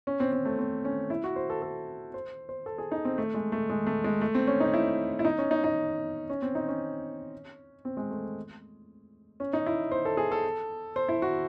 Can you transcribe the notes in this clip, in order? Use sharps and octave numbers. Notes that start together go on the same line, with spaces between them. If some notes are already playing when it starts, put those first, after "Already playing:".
C#4
C4
C4
A3
C4
C#4
E4
F#4
C5
A4
A4
C5
C5
A4
G#4
D#4
C4
A3
G#3
A3
G#3
A3
G#3
A3
C4
C#4
D#4
E4
E4
D#4
C#4
D#4
D#4
C#4
C4
D#4
C#4
C4
G#3
A3
C#4
D#4
E4
C5
A4
G#4
A4
C5
E4
F#4